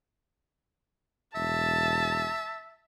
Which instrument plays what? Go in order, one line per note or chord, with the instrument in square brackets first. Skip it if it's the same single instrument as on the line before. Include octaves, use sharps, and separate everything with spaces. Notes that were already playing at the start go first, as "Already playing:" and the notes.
[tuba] E1 [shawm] E5 [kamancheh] A5